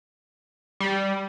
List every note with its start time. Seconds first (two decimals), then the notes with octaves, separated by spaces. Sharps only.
0.80 G3